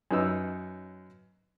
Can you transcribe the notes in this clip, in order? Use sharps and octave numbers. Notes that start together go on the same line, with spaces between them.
F#2 F#3 D#4 B4 E6